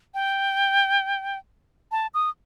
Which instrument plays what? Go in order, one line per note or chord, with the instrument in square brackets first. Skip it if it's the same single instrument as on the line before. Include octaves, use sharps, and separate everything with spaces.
[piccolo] G5
A5
D#6